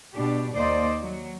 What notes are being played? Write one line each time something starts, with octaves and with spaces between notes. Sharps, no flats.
B2 D4 G4
D#2 A#3 C5 D5 D#5
F#3